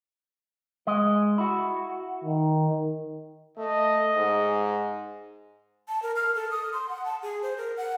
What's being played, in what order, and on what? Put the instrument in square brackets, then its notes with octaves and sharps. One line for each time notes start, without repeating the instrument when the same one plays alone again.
[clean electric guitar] G#3 D#5
E4 F#4
[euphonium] D#3
[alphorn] A3 [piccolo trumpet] D#5
[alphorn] G#2
[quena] A5
A#4
F6
A4
D#6
C6
F#5
A5
G#4
C5
A#4
F#5